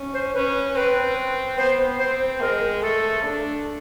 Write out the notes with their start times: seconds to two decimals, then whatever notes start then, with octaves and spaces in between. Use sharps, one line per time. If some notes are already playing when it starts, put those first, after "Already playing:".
Already playing: C#4
0.14 C5
0.34 C#4 B4
0.76 C4 B4
1.58 B3 C5
1.99 C4 C5
2.41 G#3 A#4
2.82 A3 A4
3.23 D4